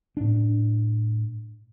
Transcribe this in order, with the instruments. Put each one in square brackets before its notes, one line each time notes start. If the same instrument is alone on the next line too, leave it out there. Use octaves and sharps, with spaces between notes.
[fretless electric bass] A2 D4